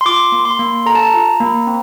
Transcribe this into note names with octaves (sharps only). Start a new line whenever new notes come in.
C6
F4 D6
A#3
C6
A#3
A4 A#5
A5
A#5
F4
A#3
C4